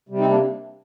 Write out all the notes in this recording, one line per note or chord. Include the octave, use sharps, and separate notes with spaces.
C3 G3
C4 D#4
A#3 D4